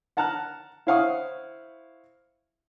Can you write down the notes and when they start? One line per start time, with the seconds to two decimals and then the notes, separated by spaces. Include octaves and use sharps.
0.17 F#5 A5 A#5 F6 F#6
0.87 E4 C5 F5 F#5 C#6 D#6